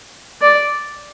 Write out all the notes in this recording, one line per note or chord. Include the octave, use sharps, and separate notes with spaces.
D5